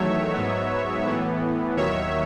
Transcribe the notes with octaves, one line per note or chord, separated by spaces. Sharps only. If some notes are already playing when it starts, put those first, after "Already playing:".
Already playing: E2 D#3 F#3 A3 C#5 E5
G#2 F#3 B3
A2 E3 B3
D#2 D#3 F#3 C#5 E5